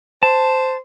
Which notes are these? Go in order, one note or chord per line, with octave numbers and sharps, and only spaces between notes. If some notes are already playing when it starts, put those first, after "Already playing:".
C5 A5